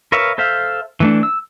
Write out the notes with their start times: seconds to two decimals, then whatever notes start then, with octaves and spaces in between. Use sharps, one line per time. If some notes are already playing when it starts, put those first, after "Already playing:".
0.12 A#4 B4 C#5 E5 F5
0.38 A4 C5 E5 F5
1.00 E3 A3 D4
1.23 E6